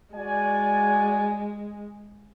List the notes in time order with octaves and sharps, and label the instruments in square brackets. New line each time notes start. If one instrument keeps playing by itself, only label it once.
[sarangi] G#3 [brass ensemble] F#4 D5 G#5